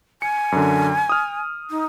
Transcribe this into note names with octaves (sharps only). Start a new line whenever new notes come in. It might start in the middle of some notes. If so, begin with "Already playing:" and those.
G#5 C#7
F#2 D3
D#6 F6
D#4